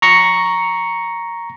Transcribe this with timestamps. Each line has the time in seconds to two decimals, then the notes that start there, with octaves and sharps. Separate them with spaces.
0.02 A#5 C#6 A#6 C#7